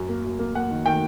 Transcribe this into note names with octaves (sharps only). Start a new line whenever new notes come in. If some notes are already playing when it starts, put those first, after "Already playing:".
Already playing: F#2
A#3
F#2
A#3
A#3 F#5
D#3
D#3 G5